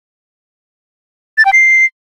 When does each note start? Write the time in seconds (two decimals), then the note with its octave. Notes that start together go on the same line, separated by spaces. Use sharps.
1.38 A6
1.45 G5
1.53 C7